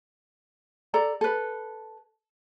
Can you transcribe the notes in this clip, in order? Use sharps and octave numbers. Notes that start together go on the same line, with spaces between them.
A4 D5 A#5
A4 B4